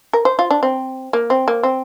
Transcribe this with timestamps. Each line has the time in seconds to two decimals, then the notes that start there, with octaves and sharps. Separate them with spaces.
0.13 A#4
0.25 C5
0.39 F4
0.51 D4
0.63 C4
1.13 A#3
1.30 C4
1.48 A#3
1.63 C4